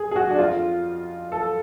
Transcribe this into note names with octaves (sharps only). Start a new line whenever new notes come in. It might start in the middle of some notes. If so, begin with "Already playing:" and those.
Already playing: G#4
G#4
F#4
D4
F2 F3 F4
A4